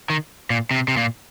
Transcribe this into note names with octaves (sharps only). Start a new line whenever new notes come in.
D#3
A#2
C3
C3
A#2